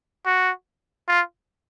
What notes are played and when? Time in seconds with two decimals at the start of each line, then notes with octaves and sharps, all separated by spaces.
0.26 F#4
1.08 F4